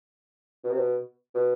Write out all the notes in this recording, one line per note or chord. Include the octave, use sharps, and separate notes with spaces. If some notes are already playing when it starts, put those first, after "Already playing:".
B2
C3
B2
B2